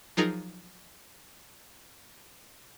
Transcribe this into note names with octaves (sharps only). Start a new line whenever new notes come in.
F3 F#3 D#4 F4 G#4 A#4